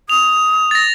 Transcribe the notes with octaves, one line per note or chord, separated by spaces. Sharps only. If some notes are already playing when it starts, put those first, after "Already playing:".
D#6 F7
A6 A#6